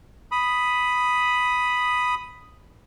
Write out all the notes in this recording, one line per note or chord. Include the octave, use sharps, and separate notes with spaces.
B5 D#6